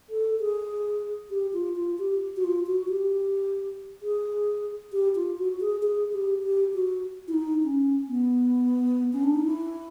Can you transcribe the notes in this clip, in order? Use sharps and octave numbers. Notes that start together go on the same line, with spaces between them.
A4
G#4
G4
F4
F4
G4
F#4
F4
F#4
G4
G#4
G4
F4
F#4
G#4
G#4
G4
G4
F#4
E4
D#4
C#4
B3
C#4
D4
D#4
E4